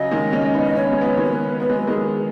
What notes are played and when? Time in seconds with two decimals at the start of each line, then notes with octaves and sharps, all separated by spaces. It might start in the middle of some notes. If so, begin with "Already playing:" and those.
Already playing: C#3 F#3 D#5
0.11 D#3 G#3
0.33 G#3 C#4
0.54 B3 D#4
0.65 D#5
0.75 C#4 C#5
0.84 B3
0.92 G#3
1.01 F#3 B3 C#5
1.17 D#3 G#3
1.24 C#5
1.32 B4
1.60 B3 B4
1.69 G#3
1.79 F#3
1.87 D#3 G#3 G#4